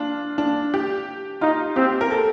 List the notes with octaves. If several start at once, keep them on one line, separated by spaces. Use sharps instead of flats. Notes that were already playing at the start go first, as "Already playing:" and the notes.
Already playing: D4 F4
D4
G4
D#4 F4
C4 G4
A#4
A4